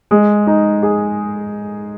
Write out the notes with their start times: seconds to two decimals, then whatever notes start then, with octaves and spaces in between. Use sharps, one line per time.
0.11 G#3
0.47 D#4
0.83 G#4